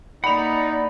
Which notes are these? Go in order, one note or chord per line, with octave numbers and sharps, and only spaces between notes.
A#3 D#4 E4 D5 F#5 B5 F7